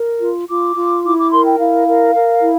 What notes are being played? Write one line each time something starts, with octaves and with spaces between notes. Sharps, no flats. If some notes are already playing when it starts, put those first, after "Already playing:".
Already playing: A#4
F4
F4 D6
F4
E4 D6
D6
A#4 C6
G5
E4 F5
A#4
A#4
E4